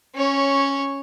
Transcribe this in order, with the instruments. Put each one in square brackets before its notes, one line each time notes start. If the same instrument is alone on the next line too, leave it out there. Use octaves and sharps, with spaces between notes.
[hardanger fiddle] C#4 C#5